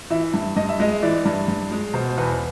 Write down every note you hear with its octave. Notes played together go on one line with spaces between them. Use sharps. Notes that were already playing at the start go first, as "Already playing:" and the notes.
E3 E5
G2
G2 D#5
E5
G#3 D#5
E3 D5
G2
G2
G#3
B2 C5
C5
E2 B4